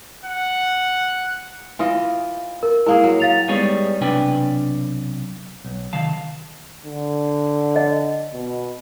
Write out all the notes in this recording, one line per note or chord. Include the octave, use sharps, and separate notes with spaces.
F#5
E3 F4 D#5
A#4
G#3 A#3 E4 G#4 A#4
F#3
F5 A6 F7
G3 G#3 B3 D#4 G#4 C#5
B1 C3 D4 B4 G5 G#5
B1
C3 D#3 F5 A5
D3
D#5
B2